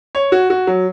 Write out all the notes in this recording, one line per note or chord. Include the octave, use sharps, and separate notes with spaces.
C#5
F#4
F#4
F#3